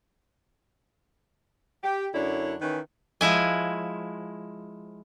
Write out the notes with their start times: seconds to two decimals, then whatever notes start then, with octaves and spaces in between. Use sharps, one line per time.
1.83 G4
2.13 F#2 D3 D4 E4 C#5
2.60 D#3 E3 C#4 D#4 B4
3.21 F3 G#3 E4 G#5